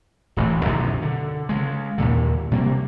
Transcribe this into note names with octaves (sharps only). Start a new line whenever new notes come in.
D1 A1 E3 A3
B1 F#2 D3 D#3
D3
C#3 G#3
D#2 A#2 D3
C3 G3 A#3